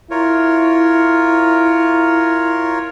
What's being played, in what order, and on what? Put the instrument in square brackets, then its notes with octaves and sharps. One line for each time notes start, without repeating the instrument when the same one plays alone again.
[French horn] E4 [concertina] F4 A#4 C#5